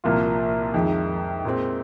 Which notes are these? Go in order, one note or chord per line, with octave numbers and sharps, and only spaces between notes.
C2 A#2 F3 A#3 F4
F2 D#3 G#3
A#2 G#3 C4